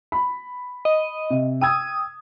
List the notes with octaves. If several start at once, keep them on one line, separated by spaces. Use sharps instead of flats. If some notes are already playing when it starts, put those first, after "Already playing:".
B5
D#5
C3
G5 D#6 E6 G#6